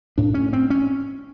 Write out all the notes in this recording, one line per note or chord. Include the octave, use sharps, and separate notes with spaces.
A2 D4
C#4
C4
C#4